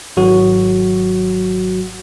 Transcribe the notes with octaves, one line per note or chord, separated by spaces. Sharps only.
G#1 F#3 F#4